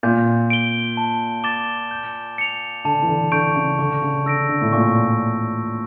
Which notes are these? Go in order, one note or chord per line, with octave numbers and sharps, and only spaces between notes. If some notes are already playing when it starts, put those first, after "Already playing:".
A#2 G6
D7 G7
A5
D6 A6 E7 G7
G6
C#7 F7
D3 A5
E3
D3
D3 C#6 G6 D7
C#3
D3 C#6
C#3
D3 E6 A#6 D7
D3
A2
A#2 C#6